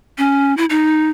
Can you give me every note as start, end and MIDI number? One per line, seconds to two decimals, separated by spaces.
0.18 0.56 61
0.57 0.65 64
0.70 1.09 63